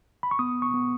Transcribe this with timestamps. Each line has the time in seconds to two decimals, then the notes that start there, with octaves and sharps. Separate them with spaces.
0.23 B5
0.31 C#6
0.39 B3 D#6
0.62 C#6
0.74 B3